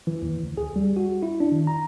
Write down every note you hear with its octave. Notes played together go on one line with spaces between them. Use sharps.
E3
D#2
D2
G#4
G3
F#4
E4
D4
D#3
A#5